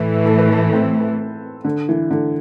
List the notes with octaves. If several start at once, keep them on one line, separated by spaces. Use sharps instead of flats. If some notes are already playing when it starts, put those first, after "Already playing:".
Already playing: A2 E3 A3 B4
A4
B4
A4
C4
D3
E3
D3